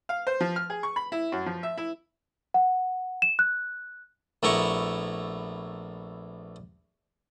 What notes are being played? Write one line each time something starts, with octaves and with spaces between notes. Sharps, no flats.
F5
C5
F3
F6
G#4
C#6
B5
E4
F#2
F3
E5
E4
F#5
E7
F#6
A#1 A3 B3 E4 A#5 C#6